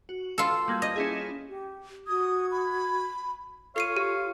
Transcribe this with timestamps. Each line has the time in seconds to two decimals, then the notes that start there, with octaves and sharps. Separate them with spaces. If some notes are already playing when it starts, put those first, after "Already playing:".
0.09 F#4
0.38 F4 A4 E6
0.68 G3 A#3 G#6
0.82 D#5
0.96 C#4 E4 G#4
1.49 G4
2.07 F#4 D#6 G#6
2.51 B5
3.76 F4 A4 C#5 F5 C7 D#7
3.97 G4